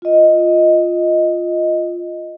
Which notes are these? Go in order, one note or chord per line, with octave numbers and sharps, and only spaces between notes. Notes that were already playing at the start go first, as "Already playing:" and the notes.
F4 D#5